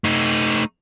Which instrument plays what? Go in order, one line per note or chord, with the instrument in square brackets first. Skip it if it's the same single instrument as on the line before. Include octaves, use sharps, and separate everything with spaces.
[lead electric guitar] A3 D#4